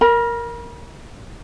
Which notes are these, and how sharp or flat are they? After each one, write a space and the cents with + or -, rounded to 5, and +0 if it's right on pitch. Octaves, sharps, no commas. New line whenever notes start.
A#4 +0 B5 -45